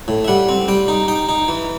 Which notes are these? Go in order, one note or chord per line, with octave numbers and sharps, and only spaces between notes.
A2
E5
G3 F#5
C4
G3 G5
D#4
D#4 G5
D#4
E3